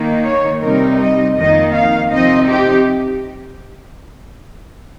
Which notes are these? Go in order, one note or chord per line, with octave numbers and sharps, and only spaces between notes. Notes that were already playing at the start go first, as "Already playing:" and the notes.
Already playing: D#3 A#3 D#4
C#5
C3 G3 C4 D#4 A#4
D#5
F2 D#3 A#3 D#4 D#5
F5
C3 F3 C4 D#4 D#5
G4